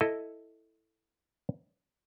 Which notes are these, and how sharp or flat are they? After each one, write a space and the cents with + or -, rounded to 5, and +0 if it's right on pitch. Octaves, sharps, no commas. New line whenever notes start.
E4 +0 A4 +5 D#5 +0